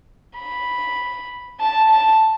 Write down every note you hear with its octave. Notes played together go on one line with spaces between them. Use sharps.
B5
A5
A5